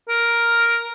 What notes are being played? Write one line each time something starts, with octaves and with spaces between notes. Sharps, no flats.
A#4